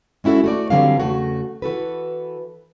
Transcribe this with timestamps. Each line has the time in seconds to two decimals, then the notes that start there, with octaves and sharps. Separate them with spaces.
0.24 G#3 C#4 E4 F#4 A4
0.44 A3 F#4 D5
0.70 D3 E3 F#3 G3 C4 F5
1.00 E2 C#3 A3 F#4
1.62 E3 F#4 A4 B4